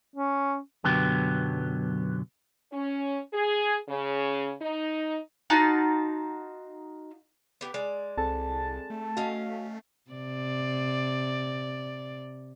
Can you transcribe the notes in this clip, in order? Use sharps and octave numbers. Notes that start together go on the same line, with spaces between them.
C#4
B1 F#2 D3 F#3 B3 G4
C#4
G#4
C#3
D#4
D#4 F4 F#4 A5
B3 G4
G#3 D5
C2 C4 G#4 A4 A5
A3
C#4 F#4 D#5 F5
C3 D5